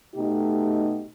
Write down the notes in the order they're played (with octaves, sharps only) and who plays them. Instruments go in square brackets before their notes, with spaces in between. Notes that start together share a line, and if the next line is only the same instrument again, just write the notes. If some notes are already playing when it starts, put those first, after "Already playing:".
[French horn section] B2 A3 D#4 G4